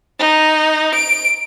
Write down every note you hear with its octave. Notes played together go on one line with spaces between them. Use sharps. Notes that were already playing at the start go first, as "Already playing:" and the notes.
D#4
D7